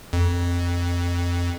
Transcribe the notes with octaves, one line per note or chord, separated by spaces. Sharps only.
F2